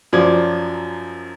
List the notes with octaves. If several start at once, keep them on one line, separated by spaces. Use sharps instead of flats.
F#2 F3 F#3 D5 G#6